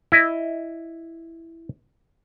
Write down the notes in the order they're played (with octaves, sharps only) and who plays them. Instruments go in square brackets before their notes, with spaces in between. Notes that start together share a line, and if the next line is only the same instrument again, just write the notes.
[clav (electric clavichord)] E4 D#5